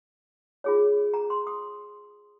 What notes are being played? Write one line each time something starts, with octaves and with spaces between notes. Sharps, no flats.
F4 G#4 C#5
A#5
C6
D#6